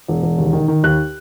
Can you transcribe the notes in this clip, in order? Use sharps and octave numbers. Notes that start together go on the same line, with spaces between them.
E1
E1
D#2
D#3
D#3
D#2 F#6